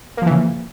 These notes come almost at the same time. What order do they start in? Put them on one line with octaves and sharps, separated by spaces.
A#3 F3 E3 C#3